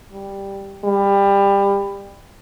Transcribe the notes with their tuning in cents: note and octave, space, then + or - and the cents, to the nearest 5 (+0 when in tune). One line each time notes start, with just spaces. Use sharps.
G3 +5
G3 +20